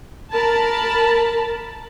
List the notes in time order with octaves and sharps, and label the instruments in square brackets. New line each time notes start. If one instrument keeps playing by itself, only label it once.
[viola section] A#4 A5 B5